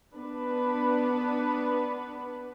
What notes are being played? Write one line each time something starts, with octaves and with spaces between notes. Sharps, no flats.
B3 D4 B4